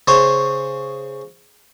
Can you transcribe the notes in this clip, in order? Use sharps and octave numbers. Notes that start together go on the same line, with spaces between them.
C#3 C5 C#5